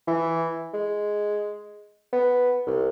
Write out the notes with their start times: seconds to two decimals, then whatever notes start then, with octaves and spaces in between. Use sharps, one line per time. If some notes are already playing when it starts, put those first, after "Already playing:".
0.08 E3
0.74 G#3
2.13 B3
2.66 C2